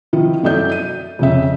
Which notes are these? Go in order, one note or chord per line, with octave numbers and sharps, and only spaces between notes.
D#3 F3 E4 F4
F#2 F#3 A4 D5 E5 G6
D#7
F2 C#3 E5